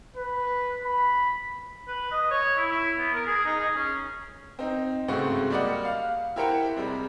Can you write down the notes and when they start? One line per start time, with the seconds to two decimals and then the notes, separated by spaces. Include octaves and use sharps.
0.16 B4
0.85 B5
1.88 B4
2.11 D#5
2.31 C#5
2.58 E4
2.71 E4
2.98 B3
3.14 A#4
3.27 G#4
3.46 D#4
3.60 G#4
3.76 C#4
4.59 C4 D#4
5.08 G#2 C#3 A3 C4 F#4
5.50 G3 A#3 D5 D#5 F#5
5.85 F5
6.36 E4 G4 A#4 C5 F#5 G5
6.76 C3 G3 G#3